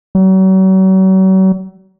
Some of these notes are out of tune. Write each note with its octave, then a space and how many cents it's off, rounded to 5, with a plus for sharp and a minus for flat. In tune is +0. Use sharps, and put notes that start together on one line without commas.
F#3 +40